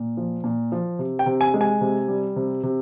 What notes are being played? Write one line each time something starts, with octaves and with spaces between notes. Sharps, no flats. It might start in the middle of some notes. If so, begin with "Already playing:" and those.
Already playing: A#2
F3
A#2
F3
C3
G5
C3
G#5
G#3
G#5
C3
G3
C3
C3